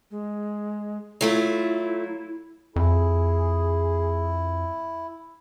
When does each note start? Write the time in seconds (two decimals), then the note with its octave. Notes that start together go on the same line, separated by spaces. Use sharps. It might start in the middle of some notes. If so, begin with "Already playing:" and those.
0.11 G#3
1.21 F#3 A3 E4 F4
2.76 F2 E4 G#4